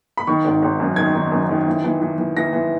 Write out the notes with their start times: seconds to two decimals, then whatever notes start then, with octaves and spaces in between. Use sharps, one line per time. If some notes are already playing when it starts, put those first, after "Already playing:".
0.17 B5
0.27 D#3 C#6
0.45 G#1
0.62 G#1
0.80 F#2
0.96 D#3 G#6
1.15 D#3
1.32 F#2
1.49 D#3
1.67 E3
1.84 E3
2.01 E3
2.18 E3
2.37 E3 A#6
2.53 E3